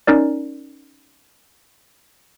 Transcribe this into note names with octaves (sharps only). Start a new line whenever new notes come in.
C#4 D#4 A#4 D5